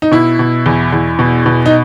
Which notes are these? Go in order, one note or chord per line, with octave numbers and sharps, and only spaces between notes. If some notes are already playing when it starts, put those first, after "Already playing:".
D#4
B2 E4
B2
E2
E2
B2
B2
D#4